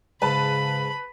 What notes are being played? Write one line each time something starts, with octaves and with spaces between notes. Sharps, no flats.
G#2 C#3 B4 A5 B5